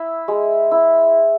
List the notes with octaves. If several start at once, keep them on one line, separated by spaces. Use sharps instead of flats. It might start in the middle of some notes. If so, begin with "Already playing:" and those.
Already playing: E4 E5
G#3
E4